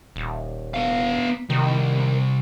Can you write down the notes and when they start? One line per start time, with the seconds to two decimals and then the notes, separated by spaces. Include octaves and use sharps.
0.16 D#1
0.74 B3 F5
1.50 C2 D#3